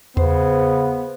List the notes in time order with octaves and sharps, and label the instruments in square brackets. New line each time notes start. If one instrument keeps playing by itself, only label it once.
[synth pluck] E2 [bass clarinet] C#3 [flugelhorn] B3 [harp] C5